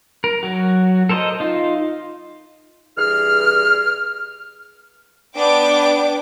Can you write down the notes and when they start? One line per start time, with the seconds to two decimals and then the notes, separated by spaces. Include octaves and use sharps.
0.24 A#4
0.43 F#3 F#4
1.09 A4 A#4 C5 C#5 D#5
1.40 D#4 F4
2.97 G2 E3 G#4 F6
5.35 B3 D4 G5 D6